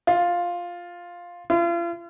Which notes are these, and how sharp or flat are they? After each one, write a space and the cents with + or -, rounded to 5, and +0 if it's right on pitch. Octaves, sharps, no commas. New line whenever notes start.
F4 +5
F4 -40